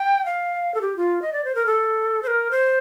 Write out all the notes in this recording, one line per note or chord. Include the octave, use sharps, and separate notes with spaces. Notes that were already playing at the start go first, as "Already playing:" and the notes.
Already playing: G5
F5
A4
G4
F4
D#5
D5
C5
A#4
A4
C5
A#4
C5